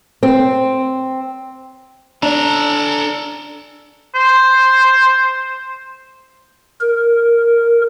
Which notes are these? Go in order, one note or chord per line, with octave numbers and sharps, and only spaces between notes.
C4
D4 A4 A#5
C5
A#4